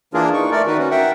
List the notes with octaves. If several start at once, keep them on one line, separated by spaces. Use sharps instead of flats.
E3 A#3 D4 F4 G#4 A#4
D#4 C#6
A3 A#4 D5
D#3 D#4 F#4 B4
C#4 F#4
A#4 E5 F#5 G5